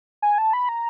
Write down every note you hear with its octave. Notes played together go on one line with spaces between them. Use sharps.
G#5
A5
B5
A#5